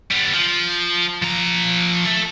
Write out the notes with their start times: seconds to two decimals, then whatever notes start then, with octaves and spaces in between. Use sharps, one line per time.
0.11 G3 B3
0.34 F3
1.22 F3 A#5
2.06 A4 E5